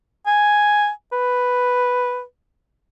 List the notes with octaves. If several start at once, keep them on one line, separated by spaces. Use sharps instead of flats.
G#5
B4